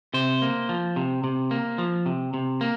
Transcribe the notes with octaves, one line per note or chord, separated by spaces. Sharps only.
C3 C5
A#3
F3
C3
C3
A#3
F3
C3
C3
A#3